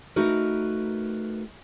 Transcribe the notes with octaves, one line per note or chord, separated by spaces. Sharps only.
A3 D#4 F#4 A#4 B4